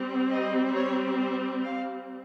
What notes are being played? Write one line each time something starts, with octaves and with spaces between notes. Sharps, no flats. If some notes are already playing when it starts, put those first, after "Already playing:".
Already playing: G3 C4
D#5
C#5
C5
F5